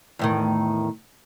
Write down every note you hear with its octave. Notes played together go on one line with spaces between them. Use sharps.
E2 A2 D#3